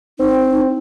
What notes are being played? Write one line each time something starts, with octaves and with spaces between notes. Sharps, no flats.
C4 D#4